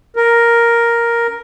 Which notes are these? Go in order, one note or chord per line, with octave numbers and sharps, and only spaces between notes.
A#4